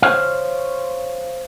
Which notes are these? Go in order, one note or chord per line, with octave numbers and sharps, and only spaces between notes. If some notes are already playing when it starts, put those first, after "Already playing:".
C5 C#5 F5